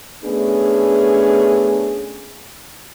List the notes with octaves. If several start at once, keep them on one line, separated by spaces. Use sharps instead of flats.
A3 B3 C#4 D4 G#4